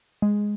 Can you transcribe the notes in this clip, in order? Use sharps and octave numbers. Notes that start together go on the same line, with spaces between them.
G#3